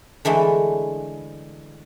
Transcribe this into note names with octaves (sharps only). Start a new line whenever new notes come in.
D3 E3 G#3 A3